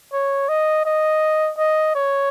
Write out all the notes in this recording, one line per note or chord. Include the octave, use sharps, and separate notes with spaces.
C#5
D#5
D#5
D#5
C#5